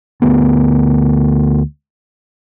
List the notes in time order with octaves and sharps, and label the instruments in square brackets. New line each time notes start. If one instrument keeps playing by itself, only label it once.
[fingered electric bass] D2 A3 B3